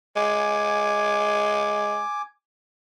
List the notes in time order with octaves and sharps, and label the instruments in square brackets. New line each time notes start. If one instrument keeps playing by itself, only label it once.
[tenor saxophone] G#3 [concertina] G#5 D6